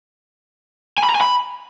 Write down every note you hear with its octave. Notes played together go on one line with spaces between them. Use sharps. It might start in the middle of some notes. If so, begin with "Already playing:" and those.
G#5
B5
A#5
G#5
B5